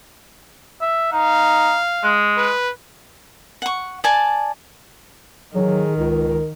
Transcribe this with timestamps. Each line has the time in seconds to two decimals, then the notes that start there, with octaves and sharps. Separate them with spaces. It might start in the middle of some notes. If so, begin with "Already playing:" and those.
0.81 E5
1.12 D#4 F5
2.03 G#3
2.38 B4
3.62 F#5 C#6
4.04 D5 G#5 A5
5.55 D#3 F#3 G#4
5.97 C#2 A#4